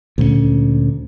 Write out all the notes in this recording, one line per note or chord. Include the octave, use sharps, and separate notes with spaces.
D2 A#2 A#3 C#4